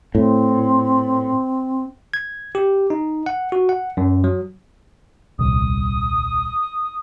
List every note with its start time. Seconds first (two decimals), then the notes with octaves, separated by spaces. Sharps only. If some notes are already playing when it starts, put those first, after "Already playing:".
0.15 A2 C4
2.14 G#6
2.55 G4
2.90 D#4
3.26 F#5
3.52 F#4
3.69 F#5
3.97 F#2
4.24 F#3
5.39 D#1 C2 D#6